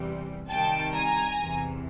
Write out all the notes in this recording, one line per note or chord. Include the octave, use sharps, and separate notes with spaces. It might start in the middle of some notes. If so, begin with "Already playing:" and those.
Already playing: E2 C3 E3 G3
C3 D#3 G3 G5 A5
G#5 A#5
E2 C3 E3